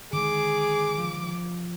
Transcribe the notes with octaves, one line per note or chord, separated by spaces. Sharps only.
D3 D#3 G#3 G#4 D6
F3